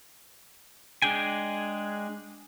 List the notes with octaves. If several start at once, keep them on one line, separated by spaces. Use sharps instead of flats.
G#3 D4 G#4 G5 G#5